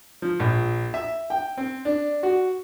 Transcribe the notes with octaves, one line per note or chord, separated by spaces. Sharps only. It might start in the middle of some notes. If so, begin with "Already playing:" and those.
F3
A#1
E5
G5
C4
D4
F#4